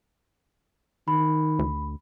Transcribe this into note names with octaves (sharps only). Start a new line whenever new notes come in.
D#3 B5
D2